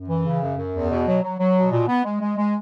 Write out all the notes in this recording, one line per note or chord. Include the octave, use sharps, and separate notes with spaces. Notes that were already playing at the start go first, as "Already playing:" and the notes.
Already playing: F#2
E3
C#3
F#2
F#2
E2
B2
F#3
F#3
F#3
B2
A#2
B3
G#3
G#3
G#3